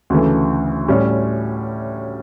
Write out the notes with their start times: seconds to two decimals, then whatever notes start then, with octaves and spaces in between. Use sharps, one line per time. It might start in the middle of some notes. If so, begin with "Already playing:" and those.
0.10 D2 C#3 E3 A3
0.88 A2 G3 C#4